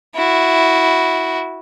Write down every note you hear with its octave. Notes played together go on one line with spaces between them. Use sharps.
E4 F#4